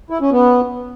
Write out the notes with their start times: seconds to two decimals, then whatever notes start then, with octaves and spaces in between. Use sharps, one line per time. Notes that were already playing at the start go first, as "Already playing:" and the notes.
0.10 E4
0.21 C#4
0.32 B3